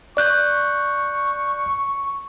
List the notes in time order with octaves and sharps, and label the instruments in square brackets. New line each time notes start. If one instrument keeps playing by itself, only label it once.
[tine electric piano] D5 F#6 G6 [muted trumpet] C#6